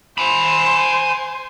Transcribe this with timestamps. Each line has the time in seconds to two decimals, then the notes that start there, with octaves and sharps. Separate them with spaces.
0.18 C5 G#5 B5